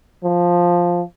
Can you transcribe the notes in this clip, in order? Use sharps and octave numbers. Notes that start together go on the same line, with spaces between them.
F3